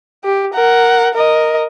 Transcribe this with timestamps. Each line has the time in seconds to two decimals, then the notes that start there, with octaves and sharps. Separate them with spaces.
0.24 G4
0.54 A#4 F#5
1.14 A#4 D#5